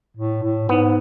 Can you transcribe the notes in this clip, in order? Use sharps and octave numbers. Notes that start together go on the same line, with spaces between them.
A2
A2
G#2 B3